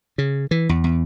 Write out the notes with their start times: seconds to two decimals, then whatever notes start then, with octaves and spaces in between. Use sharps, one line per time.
0.18 C#3
0.51 E3
0.69 E2
0.84 E2